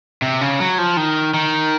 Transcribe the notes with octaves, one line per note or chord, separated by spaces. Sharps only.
C3
C#3
F#3
F3
D#3
D#3